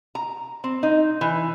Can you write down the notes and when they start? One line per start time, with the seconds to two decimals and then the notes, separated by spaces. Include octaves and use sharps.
0.15 A#5
0.64 C4
0.83 D#4
1.21 E3